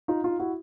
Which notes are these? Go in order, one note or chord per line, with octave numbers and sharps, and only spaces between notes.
D#4 F4
D#4 F4
E4 F#4